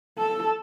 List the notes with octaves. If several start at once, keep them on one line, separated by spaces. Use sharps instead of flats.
A4